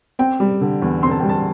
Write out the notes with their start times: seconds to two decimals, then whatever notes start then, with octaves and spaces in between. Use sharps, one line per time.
0.19 C4 G5
0.40 G3
0.61 D3
0.82 E2
1.03 C4 C6
1.11 A5
1.20 G3 G5
1.29 A5